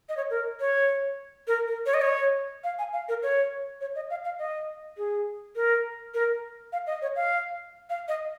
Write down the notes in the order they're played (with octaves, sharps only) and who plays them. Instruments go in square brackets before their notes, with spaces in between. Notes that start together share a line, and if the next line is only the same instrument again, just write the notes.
[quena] D#5
C#5
A#4
C#5
A#4
A#4
C#5
D#5
C#5
F5
G#5
F5
A#4
C#5
C#5
D#5
F5
F5
D#5
G#4
A#4
A#4
F5
D#5
C#5
F5
F5
D#5